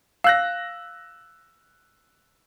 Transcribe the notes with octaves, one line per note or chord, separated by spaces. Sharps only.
F5 E6 F#6 A#6